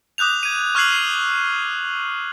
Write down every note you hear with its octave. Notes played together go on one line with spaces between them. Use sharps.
D6 D#6 F#6 G6 F7
G#6 D#7
C#6 F6 F#6 G#6 C7 F#7
C7